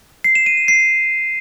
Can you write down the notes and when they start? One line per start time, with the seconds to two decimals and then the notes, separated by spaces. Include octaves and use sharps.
0.24 C7
0.35 E7
0.46 D#7
0.57 E7
0.68 C7